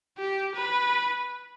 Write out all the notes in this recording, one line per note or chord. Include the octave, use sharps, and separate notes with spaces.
G4
B4